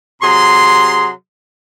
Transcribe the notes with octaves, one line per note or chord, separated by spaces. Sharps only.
C3 F#3 G#4 A#5 C6